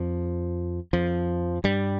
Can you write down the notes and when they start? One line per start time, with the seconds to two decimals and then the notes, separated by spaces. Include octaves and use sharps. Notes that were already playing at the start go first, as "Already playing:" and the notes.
Already playing: F2 F3
0.93 F2 F3
1.64 G2 G3